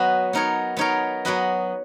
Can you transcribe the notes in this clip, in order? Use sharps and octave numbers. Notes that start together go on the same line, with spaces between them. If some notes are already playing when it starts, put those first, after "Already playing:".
Already playing: F#3 B3 F#4 B4 D#5
B3 D#4 A#4 C#5
B3 D#4 A#4 C#5
F#3 B3 F#4 B4 D#5